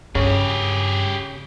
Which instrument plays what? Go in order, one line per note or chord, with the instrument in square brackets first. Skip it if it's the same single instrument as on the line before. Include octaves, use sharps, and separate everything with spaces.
[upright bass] G2 [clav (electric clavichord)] C#3 [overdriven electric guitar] G4 G#4